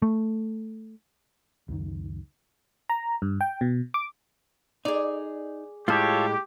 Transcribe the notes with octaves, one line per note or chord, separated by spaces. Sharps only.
A3
C#2 F#2 D#3
A#5
G2
G5
B2
D6
D#4 G#4 D5
A2 G#3 F4 G4 A4 C#5